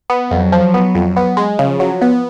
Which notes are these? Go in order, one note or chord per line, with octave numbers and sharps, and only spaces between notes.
B3
F2 F#3
F3
B3
F2
B3
G#3
C#3 F3
F#3
B3